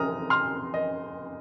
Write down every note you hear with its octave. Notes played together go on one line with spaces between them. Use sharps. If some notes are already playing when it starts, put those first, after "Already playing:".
Already playing: A#5 D#6 F6
C6 F6
D#5